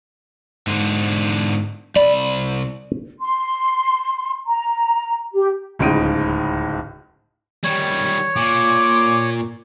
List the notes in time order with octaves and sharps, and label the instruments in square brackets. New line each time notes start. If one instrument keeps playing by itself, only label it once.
[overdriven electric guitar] G#2 D3
[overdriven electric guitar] C2 B5 [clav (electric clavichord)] D5
[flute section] C6
A#5
G4
[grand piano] D1 C#2 C#3 D#4 D7 D#7
[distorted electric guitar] D#3 G3 [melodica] C#5
[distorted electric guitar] A#2 [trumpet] D6